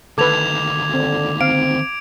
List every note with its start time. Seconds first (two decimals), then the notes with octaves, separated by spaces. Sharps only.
0.18 D2 D#3 A4 B4 D6 G#6 F7
0.94 D3 C4
1.41 C4 F5 D7